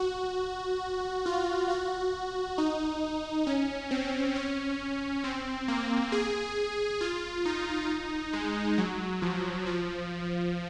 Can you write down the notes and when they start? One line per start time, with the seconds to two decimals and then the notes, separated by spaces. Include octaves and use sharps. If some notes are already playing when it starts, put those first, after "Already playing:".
Already playing: F#4
1.26 F4
1.70 F#4
2.58 D#4
3.47 C#4
3.91 C4
4.36 C#4
5.24 C4
5.68 A#3
6.12 G#4
7.01 F4
7.45 D#4
8.33 G#3
8.78 F#3
9.22 F3
9.67 F3